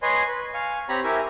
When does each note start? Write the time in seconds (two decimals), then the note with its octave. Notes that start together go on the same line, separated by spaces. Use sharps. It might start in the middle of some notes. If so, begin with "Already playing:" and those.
0.02 B4 C#5 D#5 G#5 C6
0.28 B4
0.54 F5 G#5 C#6
0.89 C4 G4 C#5 A#5 B5
1.04 E4 G4 A#4 E5 G#5